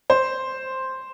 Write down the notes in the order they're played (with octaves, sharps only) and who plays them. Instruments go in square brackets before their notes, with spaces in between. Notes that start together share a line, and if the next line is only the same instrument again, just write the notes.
[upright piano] C5